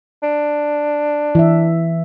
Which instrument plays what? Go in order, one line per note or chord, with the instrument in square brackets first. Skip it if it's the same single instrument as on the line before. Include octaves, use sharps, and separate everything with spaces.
[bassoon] D4
[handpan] E3 E5